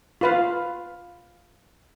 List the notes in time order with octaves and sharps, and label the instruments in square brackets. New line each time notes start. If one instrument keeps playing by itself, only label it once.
[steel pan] F4 B4 F5